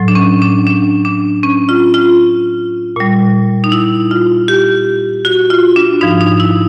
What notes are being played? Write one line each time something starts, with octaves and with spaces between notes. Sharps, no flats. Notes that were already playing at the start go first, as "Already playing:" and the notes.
Already playing: A2 F#3
D4
C#4
D4
D4
D4
C#4
F4
F4
A#2 G3
D#4
E4
F4
G4
F#4
F4
D4
G#2 F3 D#4
D#4
E4